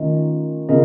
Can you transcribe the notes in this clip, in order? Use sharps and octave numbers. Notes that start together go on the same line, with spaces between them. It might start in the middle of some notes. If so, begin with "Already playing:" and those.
Already playing: D#3 A3 C#4 F4 A#4 D#5
C#3 F4 A#4 D#5